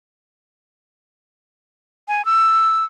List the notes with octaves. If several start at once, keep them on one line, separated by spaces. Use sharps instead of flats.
G#5
E6